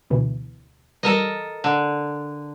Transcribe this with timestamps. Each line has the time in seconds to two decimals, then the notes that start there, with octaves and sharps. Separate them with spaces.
0.10 D2 B2 E3
1.03 E3 G3 A4 A#4 D#5
1.64 D3